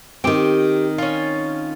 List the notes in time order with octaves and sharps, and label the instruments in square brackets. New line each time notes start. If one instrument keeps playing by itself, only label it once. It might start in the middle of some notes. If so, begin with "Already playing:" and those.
[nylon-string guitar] D#3 C4 [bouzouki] G4 G5
[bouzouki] C#4 F4